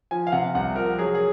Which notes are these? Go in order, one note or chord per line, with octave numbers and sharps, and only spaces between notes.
F3 G#5
F5
C3 F#5
C2 F#5
F3 A#4
F#3 G#4
G#4